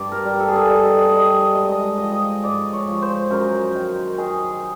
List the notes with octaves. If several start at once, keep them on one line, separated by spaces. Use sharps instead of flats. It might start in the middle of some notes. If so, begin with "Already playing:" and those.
Already playing: G2 D5
A#4
G3
A4
G#4
A4
G3 D#5
D#5
D#5
G3 D#5
D#5
D#5
G#3 D#5
D#5
D#5
F3 D#5
D#5
G#2 D5
C#5
F3
C5
F#2 A#4
D#3
D#3 G#4